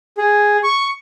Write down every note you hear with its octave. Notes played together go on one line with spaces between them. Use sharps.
G#4
C#6